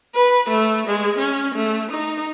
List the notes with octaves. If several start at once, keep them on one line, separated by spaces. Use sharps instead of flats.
B4
A3
G#3
C#4
A3
D#4